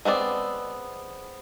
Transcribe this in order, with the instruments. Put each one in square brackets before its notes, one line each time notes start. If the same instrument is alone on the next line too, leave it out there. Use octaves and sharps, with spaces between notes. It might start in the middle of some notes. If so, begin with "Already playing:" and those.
[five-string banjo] G#3 B3 C4 D5